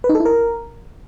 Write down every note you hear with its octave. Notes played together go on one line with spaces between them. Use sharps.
B4
D#4
A4
E4
A#4